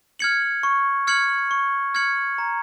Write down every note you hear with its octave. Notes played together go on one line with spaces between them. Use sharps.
F6 G#6 C#7 F#7
C#6
F6 G#6 C#7 F#7
C#6
F6 G#6 C#7 F#7
A#5